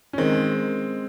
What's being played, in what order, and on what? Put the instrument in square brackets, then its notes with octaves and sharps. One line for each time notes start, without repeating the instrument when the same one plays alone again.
[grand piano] C#4
[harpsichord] D#3 [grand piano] G#3 C4